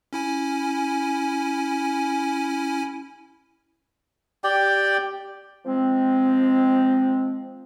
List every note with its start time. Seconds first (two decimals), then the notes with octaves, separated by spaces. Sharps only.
0.13 C#4 E4 G#5
4.44 G4 D5 G5
5.66 F3 G#3 C4